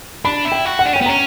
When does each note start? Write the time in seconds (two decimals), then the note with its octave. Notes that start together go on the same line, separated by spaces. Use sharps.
0.25 D4 B5
0.45 E4
0.52 G5
0.66 F#4
0.79 F#5
0.86 D4
0.93 C#4 G5
1.02 B3
1.06 C#4 A#5